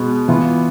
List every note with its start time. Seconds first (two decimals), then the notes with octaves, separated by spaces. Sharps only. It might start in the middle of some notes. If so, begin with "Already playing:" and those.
Already playing: B2 G#3 B3
0.28 E3 B3 F4